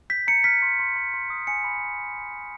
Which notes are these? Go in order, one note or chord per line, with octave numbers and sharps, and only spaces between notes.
G6 B6
A#5 C#7
F6 B6
C6
C6
C6
C6
D#6
G#5 C#7
B5